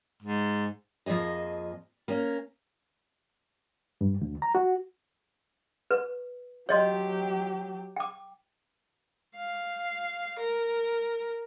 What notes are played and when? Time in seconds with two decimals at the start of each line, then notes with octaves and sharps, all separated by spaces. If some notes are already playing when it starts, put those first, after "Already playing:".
0.23 G#2
1.06 F2 F3 A#3 G#4 D#5
2.08 A#3 C#4
4.01 G2
4.21 D2
4.42 A#5
4.55 F#4
5.91 B4
6.69 F#3 G4 C#5 D#5 C6
7.96 G5 D6
9.36 F5
10.39 A#4